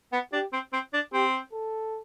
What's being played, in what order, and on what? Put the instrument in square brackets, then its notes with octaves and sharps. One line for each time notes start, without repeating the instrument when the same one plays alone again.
[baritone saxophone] B3
[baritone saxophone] D4 [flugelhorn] G4
[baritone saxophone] C4
C4
D4
[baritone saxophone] C4 [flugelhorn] G4
[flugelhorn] A4